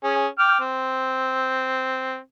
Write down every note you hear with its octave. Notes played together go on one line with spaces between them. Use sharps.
C#4 G#4
G5 D6 F6
C4